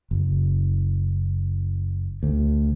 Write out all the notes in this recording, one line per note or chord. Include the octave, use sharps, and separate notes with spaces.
F#1
D2